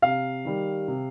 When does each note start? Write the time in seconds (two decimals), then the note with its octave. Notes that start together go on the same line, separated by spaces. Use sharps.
0.02 C3 F5
0.45 D#3 G3
0.88 C3